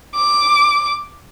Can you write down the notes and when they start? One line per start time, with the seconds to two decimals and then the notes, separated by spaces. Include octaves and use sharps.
0.16 D6